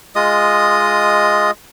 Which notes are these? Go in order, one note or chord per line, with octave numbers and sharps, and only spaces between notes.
G#3 F4 D#5 D#6